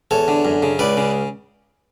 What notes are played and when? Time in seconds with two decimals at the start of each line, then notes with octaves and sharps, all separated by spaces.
0.11 E2 A4 C#5
0.28 D3
0.45 F#2
0.62 C#3
0.79 C#2 B4 D5
0.97 C#3